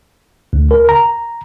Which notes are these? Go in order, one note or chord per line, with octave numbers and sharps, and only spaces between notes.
D2
A#4
A#5